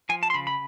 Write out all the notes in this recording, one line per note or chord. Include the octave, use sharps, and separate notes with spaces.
F3 G#5
A5
C6
C#3 B5
B5